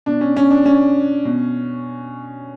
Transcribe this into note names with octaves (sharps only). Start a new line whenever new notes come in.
B2 D4
C#4
C#4
D4
C#4
B2